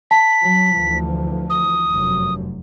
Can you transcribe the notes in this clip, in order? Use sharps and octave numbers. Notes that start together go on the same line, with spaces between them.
A5 B6
F#3
D2 E3 F3
D#6
F1 F#2